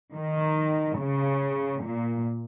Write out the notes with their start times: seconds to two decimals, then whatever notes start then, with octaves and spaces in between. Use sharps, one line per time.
0.14 D#3
0.98 C#3
1.83 A#2